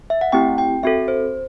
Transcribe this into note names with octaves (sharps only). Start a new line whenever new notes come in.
E5
F#5
A3 C4 E4 G4 G5
G5
C4 F#4 A4 E5
C5